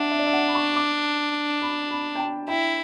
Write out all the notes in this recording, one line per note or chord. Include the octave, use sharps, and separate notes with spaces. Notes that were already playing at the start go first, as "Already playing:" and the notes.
Already playing: D4 E5 F#5
E5
D5
E5
F#5
B5
C#6
D6
B5
B5
G5
A5
E4 G5